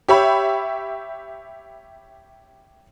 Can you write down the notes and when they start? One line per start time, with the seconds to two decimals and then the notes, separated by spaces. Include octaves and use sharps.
0.08 G4 C#5 E5 B5